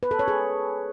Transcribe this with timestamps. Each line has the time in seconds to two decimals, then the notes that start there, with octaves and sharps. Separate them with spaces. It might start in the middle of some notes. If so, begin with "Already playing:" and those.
0.03 B4
0.11 A4
0.19 C#5
0.28 G#4